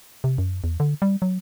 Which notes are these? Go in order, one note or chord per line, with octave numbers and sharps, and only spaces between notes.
C3
F#2
E2
D3
G3
F#3